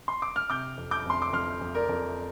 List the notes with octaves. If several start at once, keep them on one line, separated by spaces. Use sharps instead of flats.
C6
D6
F6
C3 D6 G6
F2
D6 G6
F2 C6
D6
F2 C6 F6
F2
A#4 D5
F2